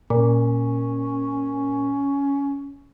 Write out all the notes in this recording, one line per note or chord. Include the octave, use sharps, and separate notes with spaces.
A#2 C#4